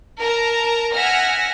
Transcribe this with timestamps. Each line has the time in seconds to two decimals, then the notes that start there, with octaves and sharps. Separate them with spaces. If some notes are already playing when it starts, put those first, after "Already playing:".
0.20 A#4 A5 A#5
0.94 E5 F#5 G#5 F6 A#6